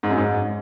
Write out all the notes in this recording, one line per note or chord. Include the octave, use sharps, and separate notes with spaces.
G#2
F#2
G#2